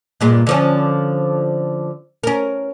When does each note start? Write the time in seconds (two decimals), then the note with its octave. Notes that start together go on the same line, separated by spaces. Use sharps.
0.21 G2 A#2 G#3
0.47 D3 F3 C#4
2.23 C#4 A#4